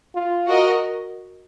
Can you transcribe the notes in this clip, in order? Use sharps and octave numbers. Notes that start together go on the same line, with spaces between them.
F4
F#4 A#4 D#5